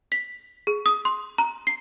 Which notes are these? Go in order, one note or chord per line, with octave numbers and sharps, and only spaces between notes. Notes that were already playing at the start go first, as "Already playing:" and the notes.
B6
G#4
D#6
C6
A#5
C7